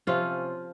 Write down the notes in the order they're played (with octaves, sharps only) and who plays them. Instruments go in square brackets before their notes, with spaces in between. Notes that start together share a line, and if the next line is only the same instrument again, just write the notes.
[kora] C3 F3 C#4 F4